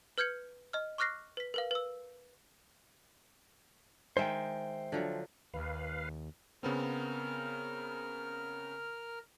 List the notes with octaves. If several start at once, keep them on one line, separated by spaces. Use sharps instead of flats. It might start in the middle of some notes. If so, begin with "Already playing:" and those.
B4 F6 G6 G#6 C#7 F#7
D#5 F6
C#6 D6 F6 F#6 A#6 C7
B4 B6
A#4 B4 F5
B4 E6
D#3 G#3 D#4 C5 E5 G5
D3 F3 F#3
D#2 B4 F5
C#3 B3 C4 A#4 F6